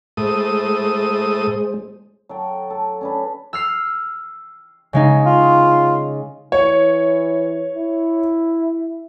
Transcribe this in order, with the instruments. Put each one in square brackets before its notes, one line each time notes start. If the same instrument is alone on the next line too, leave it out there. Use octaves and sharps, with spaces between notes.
[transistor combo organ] A2 D#6 [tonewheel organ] G#3 G#4 C5
[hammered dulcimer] F#3 A4 G5
A4
C#4 D4 B4
[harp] E6 F6 C7
C#3 G#3 D#4
[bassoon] F4
[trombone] E3 [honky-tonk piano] C#5
[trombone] E4